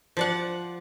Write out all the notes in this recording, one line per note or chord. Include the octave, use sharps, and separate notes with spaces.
F3 D5 F#5